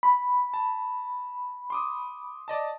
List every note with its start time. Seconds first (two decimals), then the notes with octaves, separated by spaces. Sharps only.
0.03 B5
0.54 A5
1.70 C6 D6 D#6
2.48 D5 D#5 A5